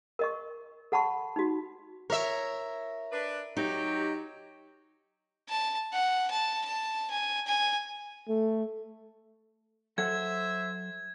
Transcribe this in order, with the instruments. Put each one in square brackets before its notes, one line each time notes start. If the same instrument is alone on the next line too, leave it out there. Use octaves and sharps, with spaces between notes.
[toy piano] A#4 D#5 C#6
A4 F#5 A5 B5 C#6
D#4 F#4
[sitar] A#4 E5 [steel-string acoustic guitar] C#5
[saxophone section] D4 B4
[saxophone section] F#3 G4 [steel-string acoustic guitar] D#4
[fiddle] A5
F#5
A5
A5
G#5
G#5
[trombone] A3
[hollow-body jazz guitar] F#3 A4 F#5 [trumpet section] C5 E5 [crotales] G#6